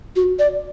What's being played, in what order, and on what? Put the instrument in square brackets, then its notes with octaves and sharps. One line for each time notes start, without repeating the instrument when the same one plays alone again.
[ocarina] F#4
D5